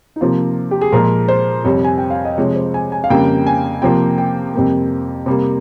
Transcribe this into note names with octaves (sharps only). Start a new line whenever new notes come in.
D#4
C3 F3 A#3 F4
G4
G#4
A#2 F3 G#3 A#4
C5
F2 C3 G3 C#5
G#5
G5
F5
D#5
C3 F3 G#3 C#5
C5
G#5
G#5
F5
F2 C#3 G3 A#3 G5
G#5
C3 F3 A#3 G5
G5
F2 C3 G3 A#3
C3 G3 A#3